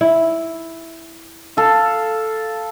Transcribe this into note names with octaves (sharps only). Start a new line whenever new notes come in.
E4
A4 F5